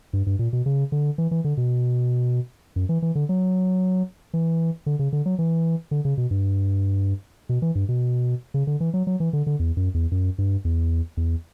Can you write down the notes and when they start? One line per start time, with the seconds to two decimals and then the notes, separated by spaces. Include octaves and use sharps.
0.13 G2
0.26 G2
0.39 A#2
0.53 B2
0.66 C#3
0.92 D3
1.18 E3
1.31 E3
1.44 D3
1.57 B2
2.76 F#2
2.89 E3
3.02 E3
3.15 D3
3.29 F#3
4.34 E3
4.86 D3
4.99 C#3
5.13 D3
5.26 F#3
5.39 E3
5.91 D3
6.05 C#3
6.17 B2
6.31 G2
7.49 B2
7.62 E3
7.75 G2
7.89 B2
8.54 C#3
8.67 D3
8.80 E3
8.94 F#3
9.07 F#3
9.20 E3
9.33 D3
9.47 D3
9.59 E2
9.77 F#2
9.94 E2
10.11 F#2
10.38 G2
10.65 E2
11.17 E2